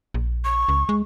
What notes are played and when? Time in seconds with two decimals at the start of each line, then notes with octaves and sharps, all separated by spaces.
0.14 A#1
0.45 C#6
0.69 C#2
0.89 G#3